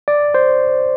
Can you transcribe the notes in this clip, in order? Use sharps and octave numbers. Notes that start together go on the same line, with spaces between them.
D5
C5